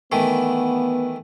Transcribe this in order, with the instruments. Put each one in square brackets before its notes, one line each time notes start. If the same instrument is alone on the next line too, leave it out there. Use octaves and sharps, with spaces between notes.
[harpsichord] D#3 E3 A3 [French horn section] B3